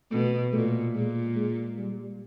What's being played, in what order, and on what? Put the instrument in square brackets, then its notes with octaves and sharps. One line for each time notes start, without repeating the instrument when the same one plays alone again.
[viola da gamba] B2 [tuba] A3
[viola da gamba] A#2 [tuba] A3
[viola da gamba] A#2 [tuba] G#3
[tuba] G#3
G3